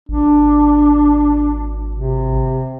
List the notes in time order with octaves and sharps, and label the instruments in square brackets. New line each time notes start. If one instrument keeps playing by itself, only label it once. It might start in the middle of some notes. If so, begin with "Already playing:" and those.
[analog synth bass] G#1 [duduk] D4
[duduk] C3